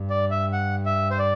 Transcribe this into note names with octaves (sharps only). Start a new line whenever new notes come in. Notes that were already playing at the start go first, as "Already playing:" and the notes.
Already playing: G2
D5
E5
F#5
E5
C5
D5